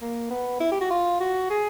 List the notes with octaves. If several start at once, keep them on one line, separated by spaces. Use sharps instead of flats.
A#3
B3
E4
G4
F#4
F4
F#4
G#4